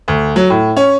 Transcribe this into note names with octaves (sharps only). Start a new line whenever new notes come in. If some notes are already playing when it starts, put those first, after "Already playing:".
D2
F#3
A2
C#4